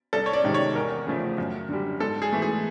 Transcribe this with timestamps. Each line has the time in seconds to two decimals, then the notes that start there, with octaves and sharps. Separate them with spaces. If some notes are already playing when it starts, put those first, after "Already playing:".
0.13 C2 A4
0.26 C#5
0.33 D5
0.44 C3 D#3 G#3
0.54 C#5
0.75 E2 A#4
1.07 C#3 F3 A3
1.38 F#2
1.69 D3 G3
2.00 G#2 A4
2.22 G#4
2.33 E3 A3
2.42 G#4